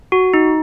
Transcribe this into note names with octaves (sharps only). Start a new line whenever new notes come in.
F#4
D#4